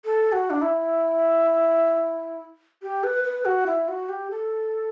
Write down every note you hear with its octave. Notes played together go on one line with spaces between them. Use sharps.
A4
F#4
D4
E4
G4
B4
B4
F#4
E4
F#4
G4
A4